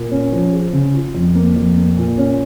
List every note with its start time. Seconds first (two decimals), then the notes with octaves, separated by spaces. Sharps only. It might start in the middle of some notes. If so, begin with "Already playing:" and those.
Already playing: A#2
0.11 C#4
0.32 F3
0.52 G#4
0.73 C#3
0.94 F4
1.14 F2
1.35 A#3
1.56 F2
1.77 A#3
1.97 A#2
2.17 C#4